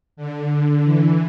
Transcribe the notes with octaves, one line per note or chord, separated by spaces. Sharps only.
D3
D3
E3